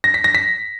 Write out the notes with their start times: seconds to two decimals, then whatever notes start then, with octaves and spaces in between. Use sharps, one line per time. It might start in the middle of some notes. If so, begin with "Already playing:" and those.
0.04 A#6
0.14 B6
0.24 A#6
0.35 B6